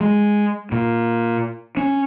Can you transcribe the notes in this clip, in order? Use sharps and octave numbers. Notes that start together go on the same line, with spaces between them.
G#3
A#2
C#4